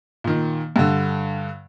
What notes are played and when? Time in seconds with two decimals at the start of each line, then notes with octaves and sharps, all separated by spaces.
0.24 A#2 D#3
0.76 G2 D3